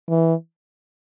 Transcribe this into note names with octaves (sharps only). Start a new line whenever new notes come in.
E3